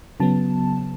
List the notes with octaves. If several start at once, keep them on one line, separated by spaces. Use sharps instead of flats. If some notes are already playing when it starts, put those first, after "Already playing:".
C#3 F#3 B3 A5